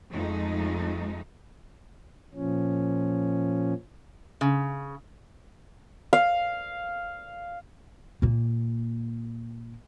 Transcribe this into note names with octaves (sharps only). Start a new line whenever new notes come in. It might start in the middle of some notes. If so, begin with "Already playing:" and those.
F2 G#3 A3 D#4
A#2 F3 C#4
C#3
F5
A#2 A#3